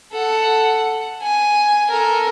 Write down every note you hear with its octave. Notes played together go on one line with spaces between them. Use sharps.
A4 F#5
G#5
A4 A#4